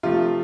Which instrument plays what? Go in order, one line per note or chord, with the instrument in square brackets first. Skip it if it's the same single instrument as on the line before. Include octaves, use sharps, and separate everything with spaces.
[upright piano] C3 F3 A3 F4